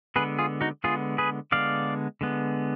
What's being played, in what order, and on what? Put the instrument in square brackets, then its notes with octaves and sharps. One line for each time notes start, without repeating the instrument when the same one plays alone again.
[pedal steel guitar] D3 G#3 B3 G#4 B4
F4 G#4
D#4 F#4
D3 G#3 B3 F4 G#4
G#4 B4
D3 G#3 B3 D5 F5
D3 G#3 B3